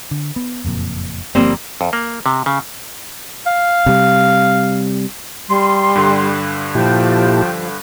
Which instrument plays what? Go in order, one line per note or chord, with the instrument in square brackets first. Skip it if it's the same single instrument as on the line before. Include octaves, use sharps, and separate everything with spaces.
[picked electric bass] D3
B3
F#1 F2 A#2
[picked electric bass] G1 F3 [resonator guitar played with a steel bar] G3 A#3 C4
[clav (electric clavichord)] F2
A#3
C3
C#3
[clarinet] F5
[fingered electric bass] C3 G3
[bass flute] G3 [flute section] C6
[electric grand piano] G2 D3
[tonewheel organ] A#2 E4 G4 [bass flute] F3 [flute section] G5 A5 G6